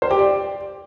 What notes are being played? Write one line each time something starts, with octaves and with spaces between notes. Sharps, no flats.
C5
G4
D5